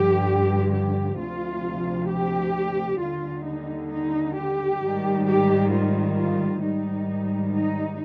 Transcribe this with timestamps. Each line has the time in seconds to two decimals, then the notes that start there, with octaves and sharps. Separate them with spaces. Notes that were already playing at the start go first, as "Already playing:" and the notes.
Already playing: G2 D3 F3 G4
0.73 G4
1.18 D2 C3 F3 F4
2.09 G4
3.00 D#2 D3 G3 F4
3.45 D#4
3.91 D#4
4.36 G4
4.81 G#2 D#3 G3
5.27 G4
5.72 F4
6.18 F4
6.63 G#2 D#3 G3 D#4
7.54 D#4